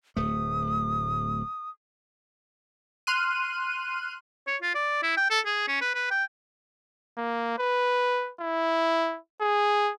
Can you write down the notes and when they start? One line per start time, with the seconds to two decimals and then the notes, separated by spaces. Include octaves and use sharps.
0.16 D1 A3 D#6
3.07 C6 F6 F#6 D#7
4.47 C#5
4.62 F4
4.75 D5
5.03 E4
5.17 G5
5.30 A4
5.46 G#4
5.68 C#4
5.81 B4
5.95 B4
6.11 G5
7.18 A#3
7.59 B4
8.41 E4
9.41 G#4